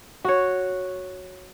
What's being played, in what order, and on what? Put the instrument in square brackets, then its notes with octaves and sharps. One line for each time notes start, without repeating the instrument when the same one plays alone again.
[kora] F#4 C#5